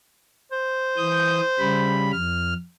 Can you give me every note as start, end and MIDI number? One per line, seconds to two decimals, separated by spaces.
0.52 2.11 72
0.97 1.40 52
0.97 1.40 87
0.97 1.40 91
1.59 2.12 49
1.59 2.12 55
1.59 2.12 83
2.12 2.53 41
2.12 2.53 89